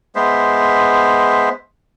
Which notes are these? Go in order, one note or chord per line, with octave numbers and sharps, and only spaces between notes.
G#3 B3 C5 E5